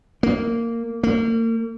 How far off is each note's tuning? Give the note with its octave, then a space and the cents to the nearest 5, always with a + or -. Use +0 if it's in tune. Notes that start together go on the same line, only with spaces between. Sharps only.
A#3 -15
A#3 -40